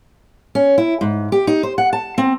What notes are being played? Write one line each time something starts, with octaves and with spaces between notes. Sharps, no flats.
C#4
E4
G#2
G4
D#4
C5
F#5
A5
C4